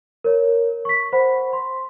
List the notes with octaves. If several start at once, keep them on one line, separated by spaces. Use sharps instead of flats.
A#4 C#5
C#6 B6
C5 F#5 B5
C6